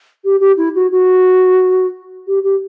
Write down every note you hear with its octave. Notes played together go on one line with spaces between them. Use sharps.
G4
G4
E4
F#4
F#4
G4
G4